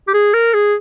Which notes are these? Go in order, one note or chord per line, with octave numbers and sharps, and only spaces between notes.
G4
G#4
A#4
G#4